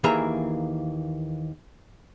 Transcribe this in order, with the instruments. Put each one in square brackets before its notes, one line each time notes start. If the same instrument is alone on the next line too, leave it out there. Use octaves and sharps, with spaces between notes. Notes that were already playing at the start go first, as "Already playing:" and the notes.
[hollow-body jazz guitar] D#2 E3 A#3 G#4 E5 A#5